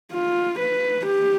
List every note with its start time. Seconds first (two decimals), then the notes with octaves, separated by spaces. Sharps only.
0.12 F4
0.59 B4
1.07 G4